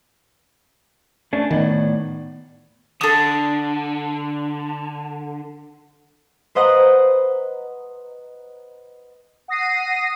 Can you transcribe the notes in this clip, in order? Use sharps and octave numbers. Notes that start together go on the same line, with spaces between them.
A3 C#4 D4
A2 D#3 B3 D5
D3 A4 D#6
B4 C5 D#5 F#5 A#5
F#5 D#6 A#6 C7 D#7